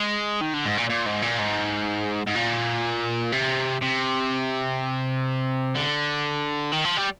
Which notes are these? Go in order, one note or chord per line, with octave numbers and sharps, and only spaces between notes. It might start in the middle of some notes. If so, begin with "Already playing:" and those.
Already playing: G#3
D#3
D3
G#2
A#2
A#2
G#2
A#2
G#2
G#2
A#2
C3
C3
D3
D#3
F3
G3